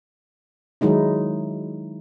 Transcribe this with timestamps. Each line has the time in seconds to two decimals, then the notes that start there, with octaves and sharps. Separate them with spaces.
0.81 D#3 F#3 G#3 D#4 E4